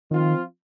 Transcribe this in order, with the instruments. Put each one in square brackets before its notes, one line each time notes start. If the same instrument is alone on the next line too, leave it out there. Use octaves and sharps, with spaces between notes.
[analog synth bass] D#3 [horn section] F3 C4 F4